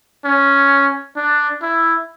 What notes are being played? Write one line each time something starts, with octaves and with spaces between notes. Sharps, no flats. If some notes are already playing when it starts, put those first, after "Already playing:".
C#4
D4
E4